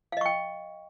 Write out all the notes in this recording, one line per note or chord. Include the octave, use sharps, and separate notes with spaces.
D#5 F5 G5 C#6